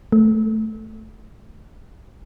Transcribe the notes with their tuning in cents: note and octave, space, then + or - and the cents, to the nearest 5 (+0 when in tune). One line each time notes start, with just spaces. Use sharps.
A3 -5